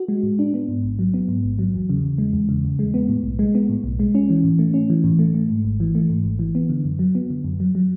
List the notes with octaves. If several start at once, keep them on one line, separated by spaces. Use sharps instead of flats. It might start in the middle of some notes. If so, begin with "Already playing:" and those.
Already playing: F#4
G#3
A2
D4
B3
G#2
A1
F#3
B3
G#2
A1
F#3
E2
C#3
E2
G#3
E2
C#3
E2
G#3
B3
A2
B1
G#3
B3
A2
B1
G#3
C#4
E3
A2
A3
C#4
E3
A2
A3
A3
G#2
G#1
E3
A3
G#2
G#1
E3
B3
D3
F#2
F#3
B3
D3
F#2
F#3
F#3